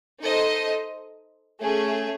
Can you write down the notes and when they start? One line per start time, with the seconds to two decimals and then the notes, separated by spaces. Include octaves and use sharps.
0.21 D#4 A4 C5 D#5
1.59 A3 C#4 G#4